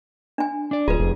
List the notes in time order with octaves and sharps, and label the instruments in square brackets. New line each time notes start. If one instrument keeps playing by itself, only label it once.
[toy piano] D4 G#5
[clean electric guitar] D4 D5
[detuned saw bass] D1 [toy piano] F4 B4 [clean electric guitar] G#4
[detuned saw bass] F1